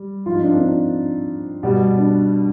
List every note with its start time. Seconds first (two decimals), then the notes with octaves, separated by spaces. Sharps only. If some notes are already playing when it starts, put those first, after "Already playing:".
Already playing: G3
0.26 G#2 F3 F4
0.34 D#4
0.43 D4
0.52 C4
0.60 D4
1.63 B2 G3
1.98 D4